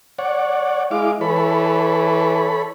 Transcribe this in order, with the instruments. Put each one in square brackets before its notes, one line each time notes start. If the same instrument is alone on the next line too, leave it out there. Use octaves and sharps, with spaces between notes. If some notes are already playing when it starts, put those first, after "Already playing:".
[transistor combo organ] C#5 D5 F#5
[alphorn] G#3 [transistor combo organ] E4 F5 D6
[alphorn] E3 [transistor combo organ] A4 C#5 B5